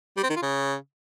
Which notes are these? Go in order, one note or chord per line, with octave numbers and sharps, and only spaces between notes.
G3
C4
D#3
F4
C#3